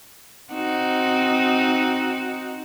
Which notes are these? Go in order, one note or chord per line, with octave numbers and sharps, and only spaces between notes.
C4 D#4 F#4